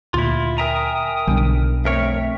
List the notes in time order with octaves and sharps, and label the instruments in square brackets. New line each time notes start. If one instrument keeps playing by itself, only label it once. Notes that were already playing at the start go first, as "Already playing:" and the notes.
[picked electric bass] D2 A#2 [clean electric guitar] E4 F4
[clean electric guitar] A#4 E5 A#5 [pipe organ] G5 G#5 D#6
[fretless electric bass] B1 D3 [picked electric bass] G3
[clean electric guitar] F2 A#4 C#5 [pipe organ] A3 C4 E5